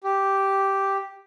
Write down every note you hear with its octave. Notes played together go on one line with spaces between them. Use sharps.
G4